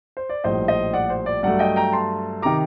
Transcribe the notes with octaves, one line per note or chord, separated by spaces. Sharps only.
C5
D5
A#1 A2 G3 C5 D#5
C5 D#5
D5 F#5
D5
C5
D5
G2 F#3 A3 D5 F#5
D#5 G5
G5 A#5
A5 C6
C3 D#3 A#5 D6